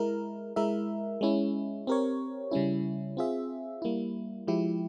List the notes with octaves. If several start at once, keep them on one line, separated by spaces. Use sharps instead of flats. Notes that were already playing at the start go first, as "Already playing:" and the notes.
Already playing: G#3 E4 A#4
G#3 E4 A#4 E5
G#3 C#4 E4
C4 G4 A#4 C#5
C#3 G3 C#4 E4
C4 F4 G#4 E5
G3 A#3 E4
F3 G#3 E4 G4